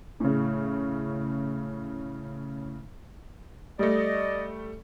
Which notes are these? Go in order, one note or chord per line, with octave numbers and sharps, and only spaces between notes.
A2 C#3
G3 A3 D5 D#5